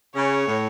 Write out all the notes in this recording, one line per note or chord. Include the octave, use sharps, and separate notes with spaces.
C#3 C#5
A2